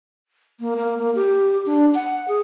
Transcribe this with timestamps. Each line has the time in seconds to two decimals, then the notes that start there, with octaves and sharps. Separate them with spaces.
0.60 A#3
0.76 A#3
0.99 A#3
1.15 G4
1.66 D4
1.95 F#5
2.28 G#4